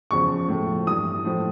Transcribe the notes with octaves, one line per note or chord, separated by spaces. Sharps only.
E2 C#3 F3 C#6
A2 F3
G2 E3 D#6
A2 F3